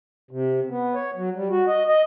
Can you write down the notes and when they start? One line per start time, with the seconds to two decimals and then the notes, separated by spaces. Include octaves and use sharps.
0.31 C3
0.70 B3
0.95 C#5
1.16 F#3
1.36 G3
1.50 F#4
1.67 D#5
1.88 D#5